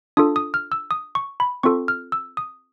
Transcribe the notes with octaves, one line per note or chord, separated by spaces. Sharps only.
D4 F4 A4 D#6
D#6
F6
E6
D#6
C#6
B5
C4 F4 A4 C#6
F6
E6
D#6